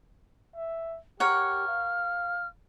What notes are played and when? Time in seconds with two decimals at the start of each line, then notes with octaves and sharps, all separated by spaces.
0.56 E5
1.20 G4 A#4 C#5 F#5 F6
1.68 F5